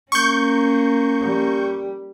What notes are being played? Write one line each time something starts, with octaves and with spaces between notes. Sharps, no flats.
A#3 C#4 C#6 G6
G3